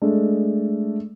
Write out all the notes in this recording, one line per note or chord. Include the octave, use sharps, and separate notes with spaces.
G#3 A3 D4